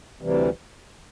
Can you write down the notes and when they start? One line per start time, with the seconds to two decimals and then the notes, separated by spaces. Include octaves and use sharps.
0.21 D2 C3 E3 G3